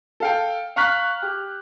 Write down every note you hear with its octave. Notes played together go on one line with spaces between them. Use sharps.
A4 F5 G5
F5 A#5 C#6 F6 F#6 B6
G4